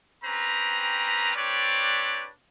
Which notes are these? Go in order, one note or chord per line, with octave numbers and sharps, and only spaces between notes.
C4 C#4 G4 B4 A#5
C4 D4 G4 B4 C#5 D5